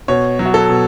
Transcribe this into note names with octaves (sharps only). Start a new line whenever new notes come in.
B2 C#5
F#3
F#4
A4
B2